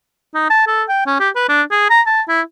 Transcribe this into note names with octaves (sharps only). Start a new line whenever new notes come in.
D#4
A5
A4
G5
C#4
G4
B4
D4
G#4
A#5
A5
E4